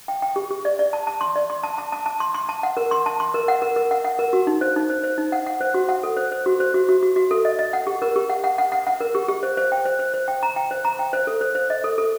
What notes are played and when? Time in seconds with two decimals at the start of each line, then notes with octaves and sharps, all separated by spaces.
0.08 G5
0.22 G5
0.36 G4
0.51 G4
0.65 D5
0.79 D5
0.93 A5
1.07 A5
1.21 C6
1.36 D5
1.50 C6
1.63 A5
1.78 A5
1.92 A5
2.06 A5
2.20 C6
2.34 C6
2.49 A5
2.63 F#5
2.77 A#4
2.91 C6
3.06 A5
3.20 C6
3.34 A#4
3.48 F#5
3.62 A#4
3.76 A#4
3.91 F#5
4.05 F#5
4.19 A#4
4.33 F#4
4.47 D#4
4.61 C5
4.76 D#4
4.90 C5
5.04 C5
5.18 D#4
5.32 F#5
5.47 F#5
5.61 C5
5.74 F#4
5.89 F#5
6.03 A4
6.17 C5
6.32 C5
6.46 F#4
6.60 C5
6.74 F#4
6.89 F#4
7.03 F#4
7.16 F#4
7.31 A4
7.45 D#5
7.59 D#5
7.73 F#5
7.87 G4
8.02 A#4
8.16 G4
8.30 F#5
8.44 F#5
8.58 F#5
8.72 F#5
8.87 F#5
9.01 A#4
9.15 G4
9.28 G4
9.43 C5
9.57 C5
9.72 G5
9.85 C5
9.99 C5
10.14 C5
10.28 G5
10.43 A#5
10.56 G5
10.71 C5
10.85 A#5
10.99 G5
11.13 C5
11.27 A4
11.41 C5
11.55 C5
11.70 D#5
11.84 A4
11.98 A4